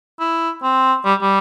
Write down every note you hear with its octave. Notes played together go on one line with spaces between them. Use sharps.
E4
C4
G3
G3